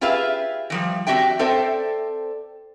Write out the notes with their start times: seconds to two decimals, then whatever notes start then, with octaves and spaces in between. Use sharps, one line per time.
0.01 F4 G4 G#4 B4 E5 F5
0.70 E3 F3 G3
1.07 C4 D4 F#4 G4 E5 G5
1.39 C4 A4 C5 D5 E5 G5